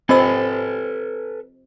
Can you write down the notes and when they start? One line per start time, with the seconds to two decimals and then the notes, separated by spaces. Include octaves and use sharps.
0.09 C4 F4 A4 B4 D#5 G#5 E6